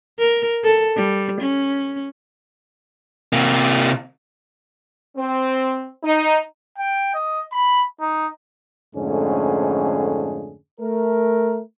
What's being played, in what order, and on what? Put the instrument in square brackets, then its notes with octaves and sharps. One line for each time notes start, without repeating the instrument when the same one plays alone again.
[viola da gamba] A#4
A4
G3
C#4
[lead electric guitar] C3 A#3
[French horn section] C4
D#4
[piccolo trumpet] G5
D#5
B5
D#4
[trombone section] F2 G#2 D3 A3 C#4 G#4
A3 A#4